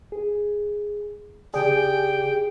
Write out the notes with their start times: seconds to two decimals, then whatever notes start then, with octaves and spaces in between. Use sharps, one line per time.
0.12 G#4
1.54 C#3 G4 G#4 D5 G5